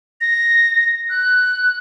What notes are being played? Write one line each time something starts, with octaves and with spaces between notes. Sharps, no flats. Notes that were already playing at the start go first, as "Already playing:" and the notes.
A#6
F#6